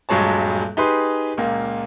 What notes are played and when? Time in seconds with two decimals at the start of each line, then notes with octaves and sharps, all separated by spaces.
0.09 D#1 G2 F#3 G#3 C#5 A5
0.77 D#4 G4 G#4 B4 C6
1.37 C#2 A#2 A#3